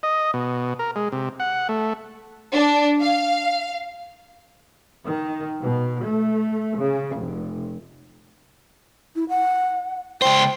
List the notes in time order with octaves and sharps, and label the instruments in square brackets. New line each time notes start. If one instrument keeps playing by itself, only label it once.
[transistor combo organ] D#5
B2
A#4
G#3
C3
F#5
A3
[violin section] D4
F5
[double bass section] D#3
B2
A3
C#3
F1
[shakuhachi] E4
F#5
[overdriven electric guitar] C#2 C5 [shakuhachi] G5